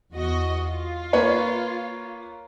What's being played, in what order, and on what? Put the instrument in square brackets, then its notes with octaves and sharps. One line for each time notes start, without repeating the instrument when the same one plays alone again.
[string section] E2 F#4 D#5
F4
[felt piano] A#3 B4 C#5